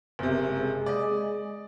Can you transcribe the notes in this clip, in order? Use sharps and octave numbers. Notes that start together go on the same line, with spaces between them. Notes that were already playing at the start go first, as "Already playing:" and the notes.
F#1 C3
G#3
D5 D#5